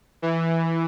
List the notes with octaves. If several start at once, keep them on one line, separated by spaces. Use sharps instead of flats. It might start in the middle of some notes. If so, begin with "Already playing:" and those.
E3